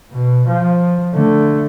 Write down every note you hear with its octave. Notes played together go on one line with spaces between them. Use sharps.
B2
F3
D3 A3